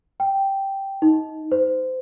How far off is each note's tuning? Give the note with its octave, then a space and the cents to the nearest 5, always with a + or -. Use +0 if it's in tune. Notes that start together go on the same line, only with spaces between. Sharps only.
G5 -5
D#4 +20
C5 -25